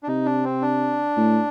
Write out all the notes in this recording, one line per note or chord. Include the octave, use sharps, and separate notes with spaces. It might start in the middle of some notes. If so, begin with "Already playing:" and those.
D4
C3 D#4
D4
C4
D4
A2